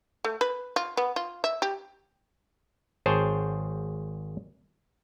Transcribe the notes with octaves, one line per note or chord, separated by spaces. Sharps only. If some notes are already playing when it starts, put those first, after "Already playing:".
A3
B4
F4
B3
F4
E5
G4
G#1 G#4 C5 C#5 G5 A5